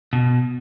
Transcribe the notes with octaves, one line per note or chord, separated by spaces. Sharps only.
B2